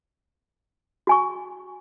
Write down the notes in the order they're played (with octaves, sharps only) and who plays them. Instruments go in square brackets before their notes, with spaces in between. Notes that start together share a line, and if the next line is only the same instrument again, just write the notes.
[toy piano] F#4 G#5 C#6